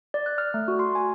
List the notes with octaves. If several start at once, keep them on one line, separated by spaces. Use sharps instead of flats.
D5
F#6
F6
A3
F#4
C6
G#5